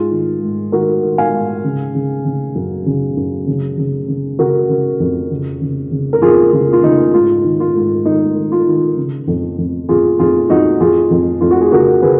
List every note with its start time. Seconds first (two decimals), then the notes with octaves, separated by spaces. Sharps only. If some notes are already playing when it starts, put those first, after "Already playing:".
Already playing: G#2 F4 G#4
0.11 D#3
0.42 G#2
0.72 D#3 F#4 A#4
1.03 D#3
1.18 F5 G#5
1.33 G#2
1.64 C#3
1.95 C#3
2.25 C#3
2.55 F#2
2.86 C#3
3.17 F#2
3.47 C#3
3.78 C#3
4.08 C#3
4.39 C#3 F#4 A#4
4.70 C#3
5.00 F2
5.31 C#3
5.61 C#3
5.91 C#3
6.13 A#4
6.22 F2 F4 G#4
6.52 C#3 F4
6.73 F4
6.83 C#3 D#4
7.14 G#2 F4
7.44 D#3
7.60 F4
7.75 G#2
8.05 D#3 D#4
8.36 D#3
8.52 F4
8.67 D#3
8.97 C#3
9.27 F2
9.58 F2
9.89 F2 F4 G#4
10.19 F2 F4 G#4
10.49 F2 D#4 F#4
10.80 F2 F4 G#4
11.11 F2
11.41 F2 F4
11.51 F#4
11.61 G#4
11.72 C#3 F#4 A#4
12.02 C#3 G#4 B4